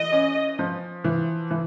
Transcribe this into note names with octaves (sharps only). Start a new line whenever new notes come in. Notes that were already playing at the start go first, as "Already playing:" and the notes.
Already playing: E3 D#5
C#4
F3
E3
E3